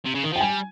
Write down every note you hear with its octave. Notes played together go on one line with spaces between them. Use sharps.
C3
C#3
D#3
F3 G5
G3 G#5